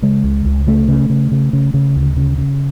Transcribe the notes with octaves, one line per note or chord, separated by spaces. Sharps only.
C#3 G#3
C#2
C#2
C#3 A3
C#3
C#3
C#3
C#3
C#3
D2
C#3
C#3